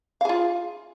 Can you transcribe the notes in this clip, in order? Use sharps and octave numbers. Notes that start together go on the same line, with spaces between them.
F4 G#4 F5